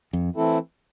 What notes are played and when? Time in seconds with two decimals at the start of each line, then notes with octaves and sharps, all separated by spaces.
0.13 F2
0.36 E3 A3 C4 E4 A4